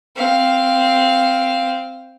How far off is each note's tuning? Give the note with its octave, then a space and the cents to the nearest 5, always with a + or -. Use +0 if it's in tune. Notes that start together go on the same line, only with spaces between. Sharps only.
C4 +0 F5 +0